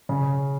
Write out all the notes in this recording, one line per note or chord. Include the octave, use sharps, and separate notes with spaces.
C#3